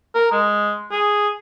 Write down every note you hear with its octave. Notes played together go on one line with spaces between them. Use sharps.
A#4
G#3
G#4